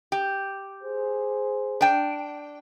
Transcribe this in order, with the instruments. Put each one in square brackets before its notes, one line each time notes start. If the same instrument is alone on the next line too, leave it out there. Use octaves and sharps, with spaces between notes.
[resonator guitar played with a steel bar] G4
[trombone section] G#4 C5
[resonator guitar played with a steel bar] D4 G5